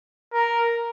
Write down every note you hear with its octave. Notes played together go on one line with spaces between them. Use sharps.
A#4